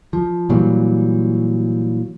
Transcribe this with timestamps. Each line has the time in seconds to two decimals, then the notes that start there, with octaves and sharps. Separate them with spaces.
0.13 F3
0.50 A#2 E3 F#3 G3